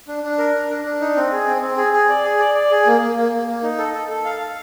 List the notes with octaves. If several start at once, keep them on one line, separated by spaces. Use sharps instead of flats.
D4
D4
A#4
D4
D4
D4
D#4
C4
G#4
C4
C4
G#4
G#4
D5
G#4
D5
D5
G#4
A#3
A#3
A#3
A#3
A#3
D#4
A4
A4
A4
F5
F5